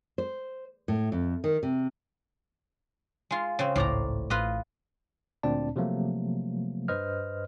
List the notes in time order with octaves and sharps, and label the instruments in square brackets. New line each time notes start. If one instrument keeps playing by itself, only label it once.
[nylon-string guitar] C5
A2
F2
D#3
C3
[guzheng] G#3 F4
C#3 C4
[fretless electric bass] G#1 C#2 [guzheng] A2 D5 A#5
[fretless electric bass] A1 [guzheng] F4 B4 D#5
[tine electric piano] D2 A#2 C4 D4 D5 A5
C3 F3 F#3 A3 A#3
G2 B4 C5 D#5 F6